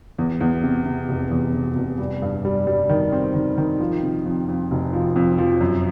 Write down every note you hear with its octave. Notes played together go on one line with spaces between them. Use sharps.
E2
E2
C3
C3
F1
E2
C3
F1
G3
G2
G3
G3
D#3
C4
D#3
D#3
F3
C3
F2
F2
F1
F3
F2
F3
F#2